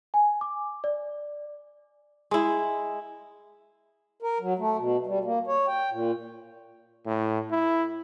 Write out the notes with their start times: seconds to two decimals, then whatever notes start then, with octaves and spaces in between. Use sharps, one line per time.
0.14 G#5
0.41 D6
0.84 D5
2.31 G#3 E4
4.22 A#4
4.40 F#3
4.59 A3
4.77 B2
5.07 G3
5.24 A#3
5.47 C#5
5.68 G5
5.91 A#2
7.06 A2
7.51 E4